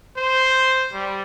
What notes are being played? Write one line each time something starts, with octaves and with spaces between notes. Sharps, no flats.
C5
G3